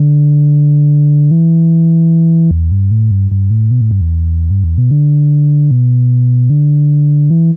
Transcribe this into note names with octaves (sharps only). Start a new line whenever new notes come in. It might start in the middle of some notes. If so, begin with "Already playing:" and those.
Already playing: D3
E3
E2
G2
A2
G2
G2
A2
B2
A2
G2
E2
G2
E2
B2
D3
B2
D3
E3